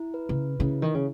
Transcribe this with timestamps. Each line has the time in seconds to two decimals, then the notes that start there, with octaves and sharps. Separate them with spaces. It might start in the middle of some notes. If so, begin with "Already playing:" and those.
Already playing: E4
0.14 B4
0.29 C#3
0.59 C#3 E4
0.82 D#3
0.94 C#3